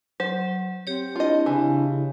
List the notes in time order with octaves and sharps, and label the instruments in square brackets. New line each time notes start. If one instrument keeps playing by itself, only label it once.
[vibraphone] F#3 [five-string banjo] C5
[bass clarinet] C4 [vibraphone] G4 C#5
[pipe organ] D4 E4 [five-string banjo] F4 D#5
[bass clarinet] C#3 [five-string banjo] E3